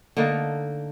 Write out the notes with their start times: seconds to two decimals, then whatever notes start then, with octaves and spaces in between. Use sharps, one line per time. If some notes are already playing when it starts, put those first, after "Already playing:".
0.17 D3 A3 A#3 D#4